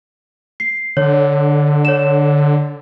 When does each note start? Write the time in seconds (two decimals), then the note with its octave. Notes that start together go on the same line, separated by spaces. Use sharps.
0.60 C7
0.97 D3 C#5
1.85 C#5 E7